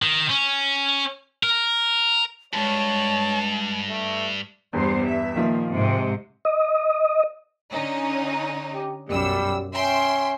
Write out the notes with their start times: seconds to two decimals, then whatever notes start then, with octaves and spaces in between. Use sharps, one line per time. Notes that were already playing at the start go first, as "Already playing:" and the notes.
0.02 D#3
0.29 C#4
1.43 A#4
2.53 D2 G2 G#3 C#5 A5
3.90 A3
4.73 E2 G2 G3 B3 C5
5.06 E5
5.36 A#2 D#3 F3 A#3
5.74 G#2 C3 G#3
6.45 D#5
7.71 D3 C#4 D#4
8.74 G4
9.09 B1 F#2 G3 E6
9.72 C#4 E5 G5 C6